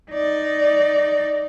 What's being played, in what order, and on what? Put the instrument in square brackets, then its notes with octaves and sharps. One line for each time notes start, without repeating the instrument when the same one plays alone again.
[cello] D#4 D5